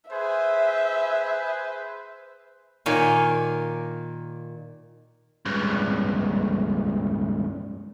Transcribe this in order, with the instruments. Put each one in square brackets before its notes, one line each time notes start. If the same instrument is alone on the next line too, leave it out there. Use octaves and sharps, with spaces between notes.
[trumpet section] G#4 B4 C5 [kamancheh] E5
[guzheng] A#2 D#3 A#3 C#5 G#5
[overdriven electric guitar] C#2 G2